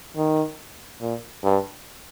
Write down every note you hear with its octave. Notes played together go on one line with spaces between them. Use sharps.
D#3
A#2
G2